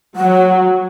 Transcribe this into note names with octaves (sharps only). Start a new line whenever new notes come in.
F#3 F#5